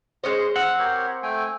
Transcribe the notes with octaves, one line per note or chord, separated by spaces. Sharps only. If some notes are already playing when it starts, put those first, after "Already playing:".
G#3 C#4 C5 D#5
C4 F#5 E6 F6
G4 A#4 C#5
A3 G5 G#5